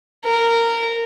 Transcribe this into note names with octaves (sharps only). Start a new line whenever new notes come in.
A#4